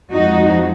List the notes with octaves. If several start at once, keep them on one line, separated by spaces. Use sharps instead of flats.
F2 F3 G#3 D#4 F#4